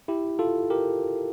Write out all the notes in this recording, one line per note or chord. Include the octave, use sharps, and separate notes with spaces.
E4 G4
F4 A4
G4 A#4